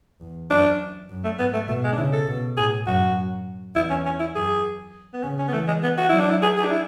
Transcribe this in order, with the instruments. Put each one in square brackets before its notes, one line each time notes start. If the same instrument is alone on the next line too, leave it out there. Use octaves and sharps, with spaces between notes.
[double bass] E2
[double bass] F#2 [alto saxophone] D4
[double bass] F#2
[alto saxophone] A3
[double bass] G#2 [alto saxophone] B3
[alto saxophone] A3
[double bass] B2 [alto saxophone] A3
[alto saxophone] G#3
D4
[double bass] C#3 [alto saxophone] E4
[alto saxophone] A4
[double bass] B2
[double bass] A2 [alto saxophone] G#4
[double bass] F#2 [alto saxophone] F#4
[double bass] E2 [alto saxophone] E4
[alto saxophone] C#4
C#4
E4
[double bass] F#2 [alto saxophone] G#4
[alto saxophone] B3
[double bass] C#3 [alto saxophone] C#4
[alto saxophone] C#4
B3
[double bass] E3 [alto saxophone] A3
[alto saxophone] G#3
B3
F#4
[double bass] F#3 [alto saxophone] E4
[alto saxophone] D4
E4
G#4
G#4
D4
E4